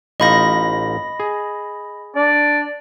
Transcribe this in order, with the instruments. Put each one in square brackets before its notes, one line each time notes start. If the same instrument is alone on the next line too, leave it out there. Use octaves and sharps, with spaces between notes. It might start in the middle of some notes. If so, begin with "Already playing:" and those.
[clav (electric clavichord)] A1 D#4 F4 [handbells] D#5 B5 A#6
[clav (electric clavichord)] G#4
[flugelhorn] D4 [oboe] D5